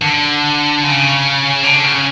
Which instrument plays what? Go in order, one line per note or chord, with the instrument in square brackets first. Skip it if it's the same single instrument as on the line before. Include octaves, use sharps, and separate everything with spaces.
[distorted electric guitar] D3
C#3
D3
C#3